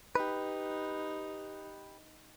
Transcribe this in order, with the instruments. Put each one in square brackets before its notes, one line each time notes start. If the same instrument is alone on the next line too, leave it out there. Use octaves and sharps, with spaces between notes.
[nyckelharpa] D#4 [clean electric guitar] G4 B4